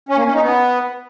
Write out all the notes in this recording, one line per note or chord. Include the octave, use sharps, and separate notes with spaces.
C#4
A#3
C#4
D#4
B3